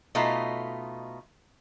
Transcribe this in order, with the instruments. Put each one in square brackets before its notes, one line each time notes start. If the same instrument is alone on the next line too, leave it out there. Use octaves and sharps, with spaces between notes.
[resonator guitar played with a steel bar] B2 A3 D#4 F4